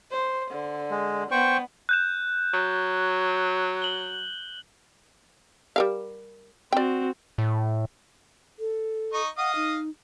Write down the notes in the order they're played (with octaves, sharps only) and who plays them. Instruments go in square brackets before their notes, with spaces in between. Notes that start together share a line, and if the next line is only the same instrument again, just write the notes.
[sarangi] C5
D3
[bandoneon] G#3
[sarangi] B3 [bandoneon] C5 G5 C#6
[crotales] F#6 G6 E7
[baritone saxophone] F#3
[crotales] F#7 G7
[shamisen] G3 A#4 F5
[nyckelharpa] C4 F#4 [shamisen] D5 G5
[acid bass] A2
[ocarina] A4
[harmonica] D#4 D#5 C#6
[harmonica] D#5 F5 D#6 [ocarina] F#5
[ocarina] D#4